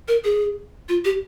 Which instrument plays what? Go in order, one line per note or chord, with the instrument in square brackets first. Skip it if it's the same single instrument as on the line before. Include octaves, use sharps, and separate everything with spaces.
[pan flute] A#4
G#4
F4
G4